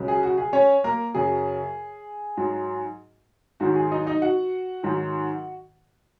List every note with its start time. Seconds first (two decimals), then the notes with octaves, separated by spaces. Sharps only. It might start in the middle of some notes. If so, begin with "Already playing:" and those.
Already playing: C#2 C#3 F#3
0.08 G#4
0.23 F#4
0.38 G#4
0.53 C#4 C#5
0.84 A#3 A#4
1.14 F#2 C#3 F#3 G#4
2.37 G#2 F#3
3.60 G#2 D#3 F#3 F#4
3.75 G#4
3.92 D#4 D#5
4.07 D#4 D#5
4.22 F#4 F#5
4.83 G#2 D#3 F#3